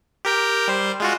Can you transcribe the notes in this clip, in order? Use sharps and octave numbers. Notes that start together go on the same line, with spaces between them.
G4 A#4 G5
G3 C5
G#3 F4 F#4